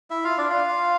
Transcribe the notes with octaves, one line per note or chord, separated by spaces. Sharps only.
E4 E5
F4 F5
D4 D5
F4 F5